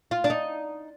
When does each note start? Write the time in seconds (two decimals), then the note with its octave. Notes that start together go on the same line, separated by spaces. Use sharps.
0.11 F4
0.24 D4
0.30 D#4